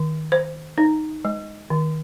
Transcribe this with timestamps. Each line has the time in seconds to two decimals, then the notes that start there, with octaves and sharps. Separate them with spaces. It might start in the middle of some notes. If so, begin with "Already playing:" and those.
Already playing: D#3
0.32 C5
0.78 D#4
1.25 G#3
1.70 D#3